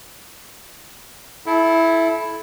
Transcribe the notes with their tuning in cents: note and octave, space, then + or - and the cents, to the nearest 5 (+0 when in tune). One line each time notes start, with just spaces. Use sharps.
E4 +0 A4 -30